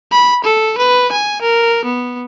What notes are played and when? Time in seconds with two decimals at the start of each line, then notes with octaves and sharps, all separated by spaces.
0.12 B5
0.44 A4
0.78 B4
1.12 G#5
1.42 A#4
1.85 B3